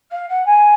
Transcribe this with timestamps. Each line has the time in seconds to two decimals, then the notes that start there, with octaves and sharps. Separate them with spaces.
0.11 F5
0.28 F#5
0.45 G#5